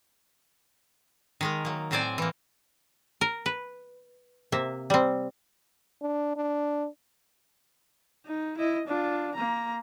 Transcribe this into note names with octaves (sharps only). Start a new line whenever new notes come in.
D#3 G#3 A#4
F#3 A#3
A2 F#3 C4 C5 D5 G#5
E3 A#3
A#4
B4
C3 A#3 E5
G3 C4
D4
D4
D#4
E4 D#5
D4 F4
A#3 A#5